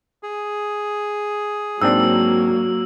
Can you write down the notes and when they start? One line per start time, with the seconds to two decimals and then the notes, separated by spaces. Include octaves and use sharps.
0.23 G#4
1.82 G#2 F#3 A#3 C4 D4 E6